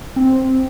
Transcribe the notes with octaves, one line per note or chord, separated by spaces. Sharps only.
C4